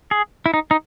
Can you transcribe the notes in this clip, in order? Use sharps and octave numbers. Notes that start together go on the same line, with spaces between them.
G#4
E4
D#4
D#4